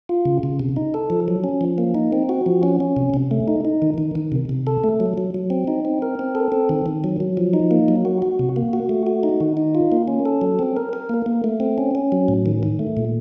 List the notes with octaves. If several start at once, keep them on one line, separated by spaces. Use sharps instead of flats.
F4
C#3
C#3
C3
D#4
A4
F3
F#3
C#4
F3
A#3
D#4
C4
F#4
F3
C#4
C#4
C3
C3
A3
D#4
D#4
D#3
D#3
D#3
C3
C3
A4
A3
F#3
F#3
F#3
C4
D#4
C4
A#4
C4
A4
C4
D#3
D#3
F#3
F#3
F3
D#4
A#3
F#3
F#4
F#4
C3
A#3
F#4
A3
F#4
D#4
D#3
D#4
F4
A#3
C#4
A4
F#3
C4
A#4
A#4
A#3
A#3
A3
C4
C#4
C#4
F#3
A2
D#3
D#3
A3
A#2